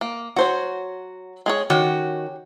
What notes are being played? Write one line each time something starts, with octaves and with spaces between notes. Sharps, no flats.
A#3
F#3 F#4 C5 C#5
G#3 G#4 C#5
D#3 C#4 F#4 G4